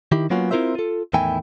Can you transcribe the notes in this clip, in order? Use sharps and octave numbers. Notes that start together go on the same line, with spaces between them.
D#3 E4 G4
F#3 A#3 B3 C#4 F4 F#4
C4 E4 F4 A#4 C5 E5
F4 A4
E2 A2 D#3 E4 G5 G#5